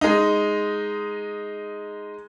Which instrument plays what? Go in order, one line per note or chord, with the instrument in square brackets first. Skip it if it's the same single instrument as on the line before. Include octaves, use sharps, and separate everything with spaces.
[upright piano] G#3 D#4